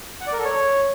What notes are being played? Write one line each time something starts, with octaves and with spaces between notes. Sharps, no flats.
F#5
D5
A#4
A4
C#5